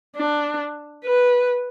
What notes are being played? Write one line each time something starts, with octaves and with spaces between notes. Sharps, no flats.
D4
B4